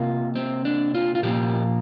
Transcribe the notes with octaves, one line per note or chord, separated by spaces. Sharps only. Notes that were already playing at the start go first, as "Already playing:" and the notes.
Already playing: C3 A#3 F4
C4
D4
F4
F4
A#2 F3 A#3 G4